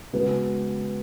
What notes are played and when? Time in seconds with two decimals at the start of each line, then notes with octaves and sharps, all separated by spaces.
0.13 C#3 G#3 B3 F#4 B4